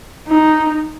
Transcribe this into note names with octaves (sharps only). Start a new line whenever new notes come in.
D#4